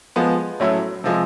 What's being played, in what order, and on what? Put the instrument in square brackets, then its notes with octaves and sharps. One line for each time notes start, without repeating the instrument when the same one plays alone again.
[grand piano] F3 G#3 B3
A2 F#3 A3 C#4 E4
C3 F3 G#3